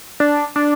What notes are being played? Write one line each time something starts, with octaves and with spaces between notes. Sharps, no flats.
D4
D4